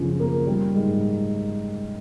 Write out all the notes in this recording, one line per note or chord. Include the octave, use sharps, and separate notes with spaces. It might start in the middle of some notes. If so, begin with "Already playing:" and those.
Already playing: F#2 C#3 F3
A#3
G3
G#2